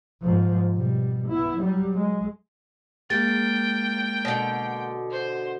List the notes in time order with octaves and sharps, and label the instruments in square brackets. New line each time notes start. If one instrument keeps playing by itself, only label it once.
[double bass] G#2 F3
B2 G3
B3 E4
F#3 G3
G#3
[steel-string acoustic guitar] G#3 A#3 [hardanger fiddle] G5 [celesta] A6
[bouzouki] B2 D3
[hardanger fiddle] C5